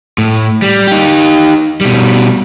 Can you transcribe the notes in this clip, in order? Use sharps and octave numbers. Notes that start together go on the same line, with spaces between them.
A2
G3
D#4 G4
B2 G3